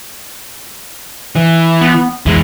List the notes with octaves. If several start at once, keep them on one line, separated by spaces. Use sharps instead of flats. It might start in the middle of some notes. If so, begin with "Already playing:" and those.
E3
B3
E2 E3 G#3